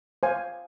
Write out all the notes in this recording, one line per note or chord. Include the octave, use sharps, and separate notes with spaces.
C5 F5 G#5